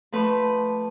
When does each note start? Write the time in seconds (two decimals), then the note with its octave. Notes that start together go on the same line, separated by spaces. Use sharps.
0.12 F3 A3 B4